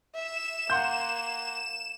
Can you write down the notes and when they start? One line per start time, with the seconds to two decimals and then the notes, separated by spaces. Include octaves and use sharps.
0.15 E5 E7
0.70 A#3 F#5 C6 G6